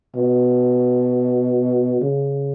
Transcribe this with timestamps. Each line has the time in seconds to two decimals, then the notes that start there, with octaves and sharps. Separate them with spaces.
0.16 B2
2.01 C#3